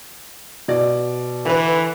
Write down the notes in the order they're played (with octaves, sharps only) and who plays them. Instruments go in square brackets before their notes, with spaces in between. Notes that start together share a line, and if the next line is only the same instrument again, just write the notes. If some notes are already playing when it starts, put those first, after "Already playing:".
[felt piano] B2 D5
[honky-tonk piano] D3 B4 [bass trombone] E3